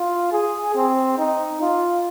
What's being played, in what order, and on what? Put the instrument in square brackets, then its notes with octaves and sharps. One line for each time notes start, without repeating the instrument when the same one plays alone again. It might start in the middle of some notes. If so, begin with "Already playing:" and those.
Already playing: [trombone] F4
G#4
C4
D#4
F4